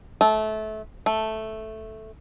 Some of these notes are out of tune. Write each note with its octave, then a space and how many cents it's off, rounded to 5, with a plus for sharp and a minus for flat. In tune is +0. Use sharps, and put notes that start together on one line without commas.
A3 -25
A3 -5